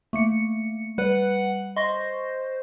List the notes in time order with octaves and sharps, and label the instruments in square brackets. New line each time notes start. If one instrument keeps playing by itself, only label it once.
[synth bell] A3 A#3 C#7
[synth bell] G3 B4 [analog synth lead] F#5
[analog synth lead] C5 [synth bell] D#5 C#6 A#6